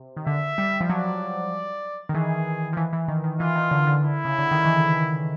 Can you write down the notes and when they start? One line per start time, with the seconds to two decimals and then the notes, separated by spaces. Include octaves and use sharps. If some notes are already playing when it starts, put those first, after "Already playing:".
Already playing: C3
0.17 D#3
0.27 D3 E5
0.58 G3
0.81 F3
0.89 F#3 D5
2.09 D#3
2.14 E3 G#4
2.73 F3
2.77 E3
2.93 E3
3.08 D#3
3.24 D#3
3.40 E3 F4
3.55 D#3
3.71 D3
3.87 D3
4.02 E4
4.25 C#3
4.39 D3
4.51 D#3
4.65 E3